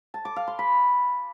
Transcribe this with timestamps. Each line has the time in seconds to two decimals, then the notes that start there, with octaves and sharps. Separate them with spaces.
0.14 A5
0.25 D6
0.36 F5
0.48 C6
0.59 B5